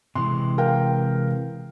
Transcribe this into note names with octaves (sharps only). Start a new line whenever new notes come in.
C3 E3 G#3 C6
A#4 F5 G5